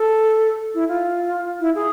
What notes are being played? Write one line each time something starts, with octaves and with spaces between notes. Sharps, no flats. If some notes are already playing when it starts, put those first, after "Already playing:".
Already playing: A4
E4
F4
E4
G#4